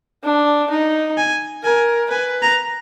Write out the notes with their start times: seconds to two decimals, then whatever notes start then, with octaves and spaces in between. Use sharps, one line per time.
0.24 D4
0.70 D#4
1.17 G#5
1.64 A#4 G#5
2.11 B4 G#5
2.42 A#5